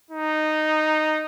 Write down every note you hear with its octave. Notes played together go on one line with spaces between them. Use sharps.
D#4